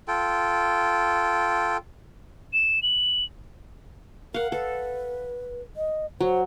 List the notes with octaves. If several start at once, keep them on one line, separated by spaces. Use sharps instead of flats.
F4 A4 G5
E7
F#7
A#4 F5 F#5
A4 B4
D#5
F#3 C5